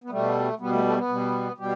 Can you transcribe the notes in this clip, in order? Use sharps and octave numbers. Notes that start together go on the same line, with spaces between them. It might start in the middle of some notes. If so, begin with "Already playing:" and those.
B3
B2 G3 A3
B2 G3 B3
A3
A3
B3
B2 G3
B2 G3 G4